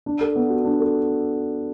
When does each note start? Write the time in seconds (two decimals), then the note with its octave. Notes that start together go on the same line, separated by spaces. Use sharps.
0.06 D4
0.21 A4
0.36 B3
0.50 F#4
0.65 D4
0.80 A4